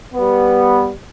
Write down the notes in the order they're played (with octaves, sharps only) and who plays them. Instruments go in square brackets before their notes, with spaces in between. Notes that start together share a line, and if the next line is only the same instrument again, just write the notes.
[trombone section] G3 B3